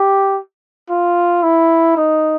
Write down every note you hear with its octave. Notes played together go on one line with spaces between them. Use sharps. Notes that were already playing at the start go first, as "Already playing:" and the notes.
Already playing: G4
F4
E4
D#4